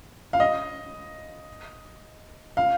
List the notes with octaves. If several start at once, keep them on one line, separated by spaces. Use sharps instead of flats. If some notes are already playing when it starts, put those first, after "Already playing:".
F5
D#5
F5